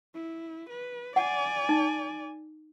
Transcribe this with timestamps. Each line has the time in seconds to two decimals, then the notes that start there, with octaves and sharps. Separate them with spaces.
0.14 E4
0.70 B4
1.16 D5 F#5 G#5
1.69 D#4